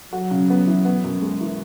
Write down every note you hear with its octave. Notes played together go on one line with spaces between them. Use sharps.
F#3 F#4
C#3
B3
E3
B3
F#2
G#3
E3